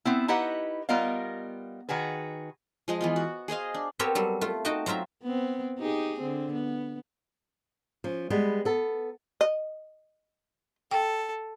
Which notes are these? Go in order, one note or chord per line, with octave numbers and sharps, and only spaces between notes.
B3 C4 E4
D#4 E4 G4 B4 D#5 F#5
G3 B3 F4 A#4 D#5 F5
D#3 F#4 G#4 B4
F3 G#3 D#5
E3 B3 F4
F#4
G#4 C5 D#5 F5
D4
B3 C4 G4 A4 A#4 C#5
F#3 G3 A4
A3 F4
D#4 F#4 D#5 G5 A5
F#3 C4 F4 E5 A#5
B3 C4
D#4 G4 G#4
D3 C4
B3
F3 C#4
G3 G#3 B3
B3 A4
D#5
A4 G5